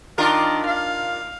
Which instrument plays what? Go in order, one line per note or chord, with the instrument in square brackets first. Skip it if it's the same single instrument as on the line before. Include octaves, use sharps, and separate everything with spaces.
[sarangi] D#3 [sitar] D4 F4 A#4
[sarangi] F5